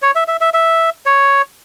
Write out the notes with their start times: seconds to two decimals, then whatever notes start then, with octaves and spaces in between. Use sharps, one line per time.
0.02 C#5
0.15 E5
0.28 E5
0.41 E5
0.54 E5
1.06 C#5